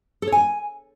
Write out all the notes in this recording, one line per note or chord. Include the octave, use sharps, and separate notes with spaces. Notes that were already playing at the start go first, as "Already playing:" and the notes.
A4
C#5
G#5